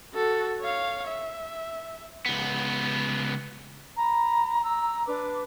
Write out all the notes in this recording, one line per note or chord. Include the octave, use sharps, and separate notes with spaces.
F#4 A4
C#5 F5
E5
C#2 B3
A#5 B5
A#5 E6
D4 B4 D6